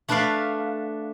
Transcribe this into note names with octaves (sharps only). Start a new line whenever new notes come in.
A3 D4 B4 D5 F5